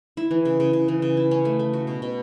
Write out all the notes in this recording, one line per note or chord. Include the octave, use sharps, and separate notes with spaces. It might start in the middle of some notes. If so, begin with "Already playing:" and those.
E4
E3
C#3
C#3
C#3
E3
C#3
E4
C#4
A3
A3
F#4
B2
B2